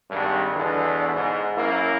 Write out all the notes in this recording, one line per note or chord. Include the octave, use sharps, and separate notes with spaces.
G#1 G2
E2 B2 D3
G#2
F#2 A#3 E4